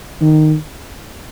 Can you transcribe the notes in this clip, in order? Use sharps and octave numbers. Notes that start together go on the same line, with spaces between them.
D#3